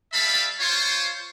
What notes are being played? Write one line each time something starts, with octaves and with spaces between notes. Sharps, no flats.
G3 A4 E5 F5 A5 B5
F4 C5 C#5